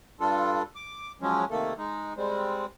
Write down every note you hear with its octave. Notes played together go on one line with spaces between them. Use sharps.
G2 G3 D4 F4 A4
D6
F3 F#3 G#3 C#4
C3 D#3 A3 A#3 A4
G#3 D#4
G3 G#3 C4